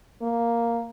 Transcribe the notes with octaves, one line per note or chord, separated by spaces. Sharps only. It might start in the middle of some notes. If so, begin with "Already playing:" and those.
A#3